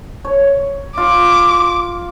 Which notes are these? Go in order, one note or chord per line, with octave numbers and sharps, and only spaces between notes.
C#5
F4 D6